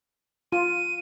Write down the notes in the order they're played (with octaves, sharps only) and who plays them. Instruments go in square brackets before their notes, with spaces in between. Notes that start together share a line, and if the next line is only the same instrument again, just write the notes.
[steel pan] F4 [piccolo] D#7